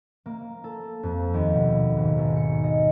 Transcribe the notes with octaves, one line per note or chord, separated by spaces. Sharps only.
A#3
A4
F2
D#2
B2
G#1
G#1
C#7
D#5